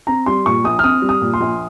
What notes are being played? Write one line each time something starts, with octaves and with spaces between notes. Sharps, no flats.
C4 A#5
G3 C6
A#2 C#6
A#1 D#6
F6
C4 D#6
G3
D#6
A#2
C6
A#1